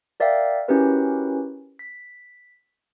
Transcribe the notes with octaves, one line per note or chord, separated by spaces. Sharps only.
A#4 D5 E5 F5 G5
C#4 E4 F#4 G4 A#4 B4
B6